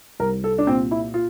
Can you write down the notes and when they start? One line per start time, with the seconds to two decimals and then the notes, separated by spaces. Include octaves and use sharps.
0.19 C2 A#4
0.44 A4
0.58 D4
0.67 A#2 C4
0.91 E4
1.14 F4